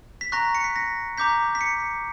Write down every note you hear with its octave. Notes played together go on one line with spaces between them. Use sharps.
B6
A#5 C#6 F#6 A#6
C#7
B6
A#6
A#5 D6 G6 B6
B6
C#7